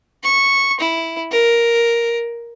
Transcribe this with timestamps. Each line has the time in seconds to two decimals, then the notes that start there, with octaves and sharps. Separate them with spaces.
0.24 C#6
0.81 E4
1.32 A#4